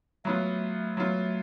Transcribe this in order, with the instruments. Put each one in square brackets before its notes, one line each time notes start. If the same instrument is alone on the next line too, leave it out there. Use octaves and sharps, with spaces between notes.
[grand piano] F#3 B3 F4 [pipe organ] A3
[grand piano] F#3 B3 F4